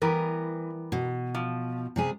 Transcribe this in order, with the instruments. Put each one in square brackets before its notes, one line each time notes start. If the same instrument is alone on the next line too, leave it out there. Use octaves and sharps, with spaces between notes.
[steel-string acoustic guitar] E3 [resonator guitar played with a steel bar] G3 B3 A#4
[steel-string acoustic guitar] B2
[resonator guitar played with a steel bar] F3
[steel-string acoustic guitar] C3 G3 G#4